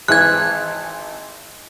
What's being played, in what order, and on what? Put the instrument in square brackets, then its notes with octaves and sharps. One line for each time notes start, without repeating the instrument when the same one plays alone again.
[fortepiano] G#1 E3 [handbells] F#6 G#6